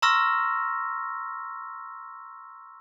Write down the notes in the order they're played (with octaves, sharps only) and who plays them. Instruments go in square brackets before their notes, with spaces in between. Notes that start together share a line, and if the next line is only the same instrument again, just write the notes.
[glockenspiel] A#5 C6 C#6 E6 F6 A#6